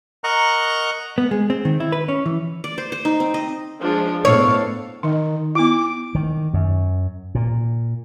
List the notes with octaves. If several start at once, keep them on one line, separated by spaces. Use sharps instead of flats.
A#4 D#5 F#5 A#5 C#6 F#6
B3
G#3
C4
D#3
E4
B4
C#4
E3
D5
C5
C5
D#4
C4
D#5
F3 G#3 D4 C5
A2 B3 D4 A4 C#5 F5
D#3 D#4
B3 E4 D6
D#3
F#2
A#2